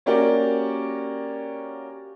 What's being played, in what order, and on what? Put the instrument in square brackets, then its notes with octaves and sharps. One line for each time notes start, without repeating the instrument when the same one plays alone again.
[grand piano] A#3 C#4 F#4 G4 A#4 D5